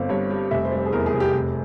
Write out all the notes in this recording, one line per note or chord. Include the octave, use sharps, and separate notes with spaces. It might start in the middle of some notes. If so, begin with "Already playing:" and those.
Already playing: G1 C4 F5
G2 C#5
G3
F1 E5
C5
G3
G#4
E2 A#4
G#4
C3
G4
F1